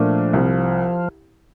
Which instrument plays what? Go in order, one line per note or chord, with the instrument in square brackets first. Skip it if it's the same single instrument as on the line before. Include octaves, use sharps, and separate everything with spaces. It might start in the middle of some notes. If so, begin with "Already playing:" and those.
Already playing: [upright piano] A#2 A3 D4 [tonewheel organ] F3
[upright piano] C2